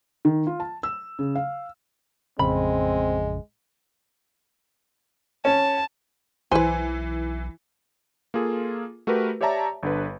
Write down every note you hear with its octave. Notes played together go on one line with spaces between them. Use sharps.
D#3
F4
A5
E6
C#3
F5
A1 F2 C#3 G#3 C4 B5
C#4 A5
B1 E3 B4 C5 G#5
A#3 F4 G#4 A4
A3 F#4 G4 A#4 B4
G4 C#5 D5 E5 A5 A#5
G1 D3 B4